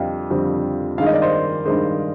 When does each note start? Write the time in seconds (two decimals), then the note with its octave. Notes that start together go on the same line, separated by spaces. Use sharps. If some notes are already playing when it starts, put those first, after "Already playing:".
Already playing: F2 D3 G3 C4 D#5 F5 G5
0.30 F2 D3 G3 C4
0.98 G2 D#3 G#3 F5
1.06 D#5
1.14 D5
1.22 C5 D#5
1.65 G2 D#3 G#3 C5